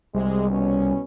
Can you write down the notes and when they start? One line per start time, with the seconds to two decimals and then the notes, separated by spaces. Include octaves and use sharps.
0.15 C2 C3 G#3
0.49 B2 C#4